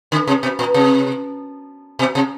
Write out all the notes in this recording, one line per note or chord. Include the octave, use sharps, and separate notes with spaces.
D3
C3
B2
A#2
C3
B2
C3